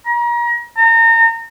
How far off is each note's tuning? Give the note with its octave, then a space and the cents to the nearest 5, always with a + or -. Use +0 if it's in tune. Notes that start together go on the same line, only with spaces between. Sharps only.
A#5 +35
A#5 -30